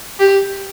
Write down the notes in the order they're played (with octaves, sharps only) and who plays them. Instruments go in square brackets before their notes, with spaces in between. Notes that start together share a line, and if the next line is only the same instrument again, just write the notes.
[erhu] G4